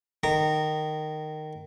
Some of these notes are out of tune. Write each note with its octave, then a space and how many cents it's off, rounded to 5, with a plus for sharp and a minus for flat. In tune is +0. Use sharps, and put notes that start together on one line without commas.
D#3 -15 A#5 -20